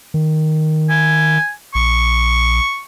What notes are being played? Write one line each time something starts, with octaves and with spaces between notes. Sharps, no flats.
D#3
G#5
A#1 C#6